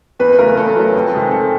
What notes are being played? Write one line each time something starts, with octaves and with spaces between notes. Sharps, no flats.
E2 B4
C#3 F#3 A3 A#4
E2 A4
C#3 F#3 A3
F2
C3 D#3 G#3 C4
F2 A4